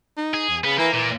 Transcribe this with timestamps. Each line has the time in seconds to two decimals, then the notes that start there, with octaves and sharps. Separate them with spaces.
0.17 D#4
0.34 G#4
0.49 E2
0.64 C#3 B3
0.79 E3 A#3
0.93 A#2 E3